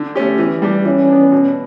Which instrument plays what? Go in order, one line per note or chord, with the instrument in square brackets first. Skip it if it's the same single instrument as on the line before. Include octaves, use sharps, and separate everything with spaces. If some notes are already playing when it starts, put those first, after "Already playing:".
Already playing: [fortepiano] D3
A3 C#4 G4
E3
G3 D4 G4
[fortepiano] E3 [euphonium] C#4
[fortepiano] B3 D4
B2